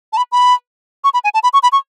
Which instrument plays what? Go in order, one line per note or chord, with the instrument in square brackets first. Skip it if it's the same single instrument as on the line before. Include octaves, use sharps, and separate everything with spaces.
[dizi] A5
B5
B5
C#6
B5
G#5
A5
B5
C#6
B5
C#6